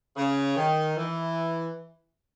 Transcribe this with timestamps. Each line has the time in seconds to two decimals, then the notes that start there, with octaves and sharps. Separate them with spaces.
0.16 C#3
0.56 D#3
0.97 E3